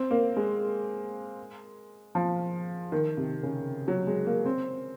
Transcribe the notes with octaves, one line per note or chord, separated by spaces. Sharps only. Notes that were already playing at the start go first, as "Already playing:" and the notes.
Already playing: C4
A#3
G#3
F3
D#3
C3
C#3
F#3
G#3
A#3
C4